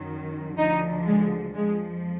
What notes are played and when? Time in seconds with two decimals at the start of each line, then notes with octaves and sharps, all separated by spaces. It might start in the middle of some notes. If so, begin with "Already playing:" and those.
Already playing: F#2 D#3 F#3
0.57 D2 D3 F3 D#4
1.06 G#3
1.55 F2 F3 G#3